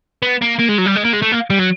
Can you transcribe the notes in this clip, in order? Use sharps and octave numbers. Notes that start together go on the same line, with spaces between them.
B3
A#3
A#3
G#3
F#3
G3
G#3
A#3
G#3
A3
A#3
G3
F#3